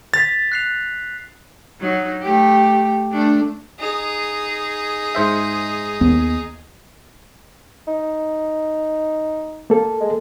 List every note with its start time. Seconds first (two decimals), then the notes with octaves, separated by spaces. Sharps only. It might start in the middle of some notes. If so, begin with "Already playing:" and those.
0.14 A6 B6 F7
0.52 F#6 C7 F7
1.80 F#3 D#4
2.22 A3 G4
3.13 A3 D4
3.79 D#4 G#4
5.15 G#2 C5 E5
6.01 D#2 B3
7.87 D#4
9.70 A#3 A4
10.00 G#3